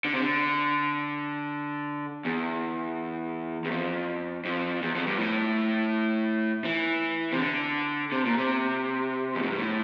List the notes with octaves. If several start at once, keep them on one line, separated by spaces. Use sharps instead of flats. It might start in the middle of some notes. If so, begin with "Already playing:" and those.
D3
C3
D3
E2
E2
F2
F2
E2
F2
G2
A2
E3
C3
D3
C3
A#2
C3
E2
F2
G2
A2